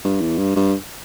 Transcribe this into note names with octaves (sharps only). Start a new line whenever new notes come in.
G2
E2
G2
G2